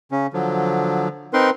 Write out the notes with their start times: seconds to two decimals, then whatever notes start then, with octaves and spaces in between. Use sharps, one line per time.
0.11 C#3 C#4
0.33 D3 F3 F#3
1.33 C4 D#4 A#4 B4 C6